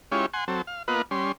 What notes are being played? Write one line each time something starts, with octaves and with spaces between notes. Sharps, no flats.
G#3 C#4 E4 F4 G4 C#5
F#5 G#5 C6
F#3 C4 A4
F5
A#3 B3 F4 B4 D#5 F#5
G3 C#4 C6